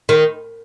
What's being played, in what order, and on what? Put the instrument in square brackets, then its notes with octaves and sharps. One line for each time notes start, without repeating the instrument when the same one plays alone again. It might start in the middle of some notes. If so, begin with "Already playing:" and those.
[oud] D#3